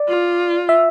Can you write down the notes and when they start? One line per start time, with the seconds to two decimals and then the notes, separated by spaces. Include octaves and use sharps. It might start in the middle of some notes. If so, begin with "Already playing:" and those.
Already playing: D5
0.09 F4
0.69 E5